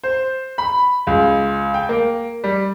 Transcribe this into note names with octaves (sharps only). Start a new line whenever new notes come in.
C5
B5
C#2
G5
A#3
G3